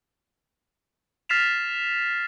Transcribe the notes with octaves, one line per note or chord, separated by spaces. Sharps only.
F6 A6 B6 C7 E7 F7